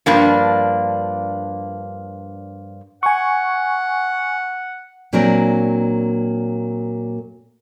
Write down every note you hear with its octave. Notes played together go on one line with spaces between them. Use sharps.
G2 F3 A#3 D4
F#5 G#5 C#6
A#2 F#3 A#3 C4 D4 A#4